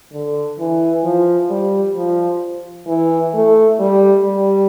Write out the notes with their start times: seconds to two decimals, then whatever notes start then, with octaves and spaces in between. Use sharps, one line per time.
0.12 D3
0.59 E3
1.04 F3
1.50 G3
1.95 F3
2.87 E3
3.34 A3
3.79 G3
4.24 G3